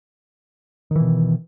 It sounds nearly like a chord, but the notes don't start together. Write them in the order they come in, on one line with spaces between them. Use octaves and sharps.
D#3 E3 B2